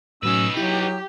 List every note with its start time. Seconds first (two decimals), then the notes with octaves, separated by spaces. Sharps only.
0.23 A2 F#3 C#4 D#4 B4 D#6 E6
0.57 F#3 E4 G4